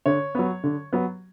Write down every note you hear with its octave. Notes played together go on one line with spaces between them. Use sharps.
D3 C#5
F#3 B3
D3
F#3 B3